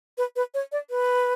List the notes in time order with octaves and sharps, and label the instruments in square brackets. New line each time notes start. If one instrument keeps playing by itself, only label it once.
[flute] B4
B4
C#5
D5
B4